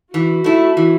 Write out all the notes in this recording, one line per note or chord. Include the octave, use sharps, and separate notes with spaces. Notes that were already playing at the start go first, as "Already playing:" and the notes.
E3 F#4
A3 E4
E3